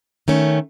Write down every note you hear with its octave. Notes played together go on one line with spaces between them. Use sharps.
D#3 A3 C#4